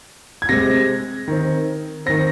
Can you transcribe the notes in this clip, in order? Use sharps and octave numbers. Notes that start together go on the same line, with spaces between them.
G#6
C3 G#3 C4 A#6
D#3 C4
D#3 C4 A#6